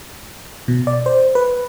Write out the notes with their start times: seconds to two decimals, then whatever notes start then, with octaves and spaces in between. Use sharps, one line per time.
0.68 B2
0.87 D5
1.06 C5
1.35 B4